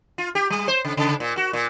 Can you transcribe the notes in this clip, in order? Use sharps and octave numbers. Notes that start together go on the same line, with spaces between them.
F4
G4
G3
C5
C#3
C#3
A#2
F#4
A#2